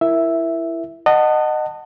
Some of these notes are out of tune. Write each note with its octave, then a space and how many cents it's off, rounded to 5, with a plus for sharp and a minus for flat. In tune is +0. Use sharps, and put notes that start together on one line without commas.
E4 +15 A#4 +0 E5 +0
D#5 -20 F#5 +10 A5 +20